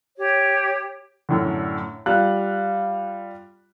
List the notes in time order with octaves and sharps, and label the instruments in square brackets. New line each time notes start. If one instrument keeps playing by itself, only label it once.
[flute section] G4 C#5
[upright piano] F#2 A2 D3
G3 F4 F#6